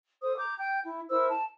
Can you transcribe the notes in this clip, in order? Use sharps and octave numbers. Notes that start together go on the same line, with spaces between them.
A4 C5 D#6
A#5 D6 G6
G5 G6
E4
E4 A#4 C5 E6
A5